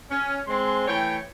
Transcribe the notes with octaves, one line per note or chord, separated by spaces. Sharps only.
C#4
G#3 C4 C6
E3 A3 C#5 G5